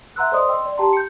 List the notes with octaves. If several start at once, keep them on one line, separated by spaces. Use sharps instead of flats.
E5 F#5 A#5 C6 E6 F#6
A4 C5 D5 D#5 C6 D#6
D#5 G5 C6 E6
D5
G4 G5 A5 A#5 C6
G6 C#7